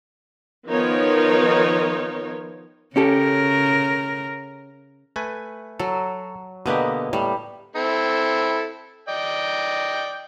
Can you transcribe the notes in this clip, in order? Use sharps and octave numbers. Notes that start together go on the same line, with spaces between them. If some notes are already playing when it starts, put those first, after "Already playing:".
D#3 F3 B3 D#4 A#4 C#5
C#3 C#4 G4 A4 A#4
A3 B4 G#5
F#3 A4
B2 D3 A#3 B3 G4 D#5
A2 G3
C4 E4 A4
D5 D#5 G5